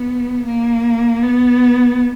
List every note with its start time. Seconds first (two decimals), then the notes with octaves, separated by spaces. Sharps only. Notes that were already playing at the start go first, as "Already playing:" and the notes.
Already playing: B3
0.46 A#3
1.23 B3